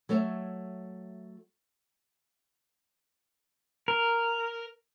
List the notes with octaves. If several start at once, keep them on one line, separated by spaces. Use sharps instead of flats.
F#3 A3 C#5 E5
A#4